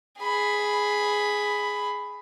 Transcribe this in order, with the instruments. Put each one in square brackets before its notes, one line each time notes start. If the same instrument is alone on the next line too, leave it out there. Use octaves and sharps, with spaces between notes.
[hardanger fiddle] G#4 B5